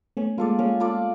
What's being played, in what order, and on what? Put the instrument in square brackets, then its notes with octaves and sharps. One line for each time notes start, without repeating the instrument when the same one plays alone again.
[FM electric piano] A3 B3 [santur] C#4
[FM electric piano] G#3 A#3 [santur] F4 A4 D5
[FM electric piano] G#3 A#3 [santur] C#4
[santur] F4 A4 D5